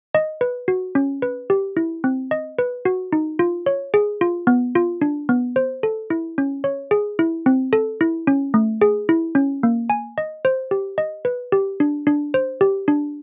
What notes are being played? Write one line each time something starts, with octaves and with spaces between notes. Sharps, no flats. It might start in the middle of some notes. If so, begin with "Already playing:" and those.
D#5
B4
F#4
C#4
B4
G4
E4
C4
D#5
B4
F#4
D#4
F4
C#5
G#4
F4
B3
F4
D4
B3
C5
A4
E4
C#4
C#5
G#4
E4
C4
A4
E4
C#4
A3
G#4
E4
C#4
A#3
G#5
D#5
C5
G4
D#5
B4
G4
D4
D4
C5
G4
D4